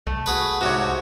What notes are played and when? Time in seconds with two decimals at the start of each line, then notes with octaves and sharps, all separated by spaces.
0.07 C2 A3
0.26 F#4 G#4 B4
0.61 G#2 C3 F#4 C#5